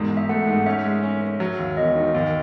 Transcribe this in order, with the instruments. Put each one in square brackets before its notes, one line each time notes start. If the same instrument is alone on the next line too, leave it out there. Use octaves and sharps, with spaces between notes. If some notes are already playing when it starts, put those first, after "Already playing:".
Already playing: [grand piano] E1 G#2
G#2
[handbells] E5
[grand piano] A3 [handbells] F#5
[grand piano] G#2
[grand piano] C#4 [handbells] E5
[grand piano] G#3
C#4
C#4
F#3
D#2
[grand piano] E1 [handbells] D#5
[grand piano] D#3
D#2